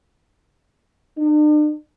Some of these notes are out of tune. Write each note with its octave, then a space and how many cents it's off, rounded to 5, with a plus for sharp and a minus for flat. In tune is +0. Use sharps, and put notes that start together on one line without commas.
D4 +45